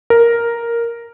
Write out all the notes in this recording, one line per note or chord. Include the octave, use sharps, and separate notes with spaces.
A#4